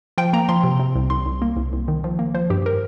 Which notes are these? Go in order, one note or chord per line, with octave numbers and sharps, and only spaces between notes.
F3 G5
A#3 A#5
F3 C6
C3
C3
C2
C2 C6
C2
A#3
C2
C2
D#3
F3
A#3
F3 C5
G2 G4
A#4